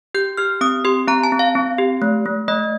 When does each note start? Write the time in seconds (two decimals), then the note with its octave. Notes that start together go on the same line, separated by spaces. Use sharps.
0.15 G4 G6
0.37 G4 F6
0.61 C4 D#6
0.85 G4 C6
1.08 C4 A#5
1.23 A5
1.32 C4
1.39 F5
1.55 C4
1.78 G4
2.02 A3
2.26 A3
2.48 A3 D#5